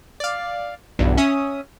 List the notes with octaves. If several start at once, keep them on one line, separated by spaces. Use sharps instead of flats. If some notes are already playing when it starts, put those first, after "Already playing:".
D5 F5
B1 E2 G2
C#4 E5 D#6